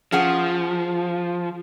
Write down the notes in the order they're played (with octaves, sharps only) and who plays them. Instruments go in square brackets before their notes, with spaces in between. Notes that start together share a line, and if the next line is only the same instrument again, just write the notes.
[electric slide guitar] F3 [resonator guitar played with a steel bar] C#4 G#4 F#5